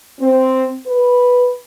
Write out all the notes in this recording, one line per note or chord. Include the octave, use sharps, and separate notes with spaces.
C4
B4